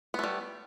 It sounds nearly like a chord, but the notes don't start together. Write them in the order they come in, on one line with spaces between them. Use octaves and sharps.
B3 A3 G3